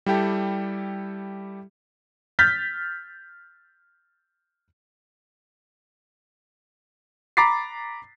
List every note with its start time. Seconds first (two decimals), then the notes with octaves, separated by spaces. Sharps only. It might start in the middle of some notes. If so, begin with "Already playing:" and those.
0.06 G3 E4 G4 A4
2.39 F6 G6 A6 B6
7.37 A#5 B5 D6 A6 B6 C7